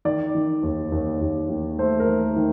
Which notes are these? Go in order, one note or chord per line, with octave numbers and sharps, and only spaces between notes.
D#3 D5
D#3
D#2
D#2
D#2
D#3
A3 C5
A#4
D#3
D#3